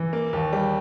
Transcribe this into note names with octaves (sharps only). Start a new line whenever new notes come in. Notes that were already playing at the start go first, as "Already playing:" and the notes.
Already playing: E3
A#3
D#2
G3